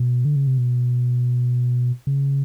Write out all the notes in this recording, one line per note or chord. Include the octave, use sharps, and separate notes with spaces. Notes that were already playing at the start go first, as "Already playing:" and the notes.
Already playing: B2
D3
C#3
C3
B2
C#3